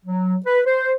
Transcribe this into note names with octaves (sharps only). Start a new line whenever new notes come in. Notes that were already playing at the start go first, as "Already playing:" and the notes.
F#3
B4
C5